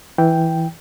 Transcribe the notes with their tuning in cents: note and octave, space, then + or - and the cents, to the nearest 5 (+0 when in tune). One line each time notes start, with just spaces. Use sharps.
E3 -5 G5 +0